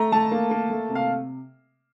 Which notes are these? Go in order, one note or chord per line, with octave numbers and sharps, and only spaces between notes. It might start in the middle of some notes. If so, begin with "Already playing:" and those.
Already playing: A3 A#5
A3 A5
A#3
A#3
A3
C3
F5